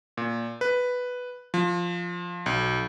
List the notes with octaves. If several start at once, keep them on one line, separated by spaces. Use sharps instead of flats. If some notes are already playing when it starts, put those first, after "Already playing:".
A#2
B4
F3
B1